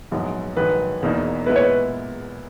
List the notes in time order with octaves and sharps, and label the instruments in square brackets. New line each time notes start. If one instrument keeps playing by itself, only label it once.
[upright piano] A#1 G#2 F#3 B3
[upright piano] A#1 G#2 D#3 F#3 [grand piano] B4
[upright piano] E1 E2 B2 A#3 D#4
[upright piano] A#2 G#3 B3 E4 [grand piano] B4
[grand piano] C#5
B4